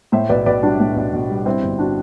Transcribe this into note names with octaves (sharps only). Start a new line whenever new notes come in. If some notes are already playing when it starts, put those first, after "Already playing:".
A2 C5 E5
B1 B4 D5
B1 B4 D5
G3 D4 F#4
A2
B1
B1
G3
G2 C4 E4
G1
D4 F#4